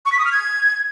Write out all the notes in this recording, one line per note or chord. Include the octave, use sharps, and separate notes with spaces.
C#6
B6
D#6
F6
G#6